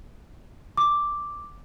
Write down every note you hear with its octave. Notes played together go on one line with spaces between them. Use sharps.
D6